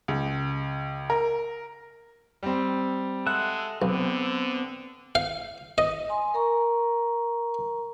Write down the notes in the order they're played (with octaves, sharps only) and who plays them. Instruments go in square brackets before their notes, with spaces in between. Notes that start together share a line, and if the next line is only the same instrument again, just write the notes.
[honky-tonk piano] C#2
A#4
[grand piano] G3 C4
[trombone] G#3 [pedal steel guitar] A4 E5 F#5 [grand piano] F#6
[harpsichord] B1 [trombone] D3 [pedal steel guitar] B3 C4
[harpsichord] F5
D#5
[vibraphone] G#5 C6
A#4 A#5 C#6